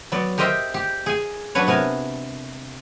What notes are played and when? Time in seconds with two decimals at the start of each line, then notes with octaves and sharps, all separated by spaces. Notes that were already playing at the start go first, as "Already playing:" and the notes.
0.12 F#3 B3 D5
0.38 G4 A#4 C5 D#5 E5 G5
0.74 G4
1.06 G#4 G#5
1.55 F#3 D4 F#4 B4 C#5
1.67 C3 B3 A#4 G#5